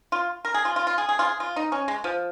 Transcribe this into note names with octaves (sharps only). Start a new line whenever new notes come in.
F4
A#4
G#4
F4
F4
F4
G#4
G#4
F4
G#4
F4
D#4
C#4
G#3
F3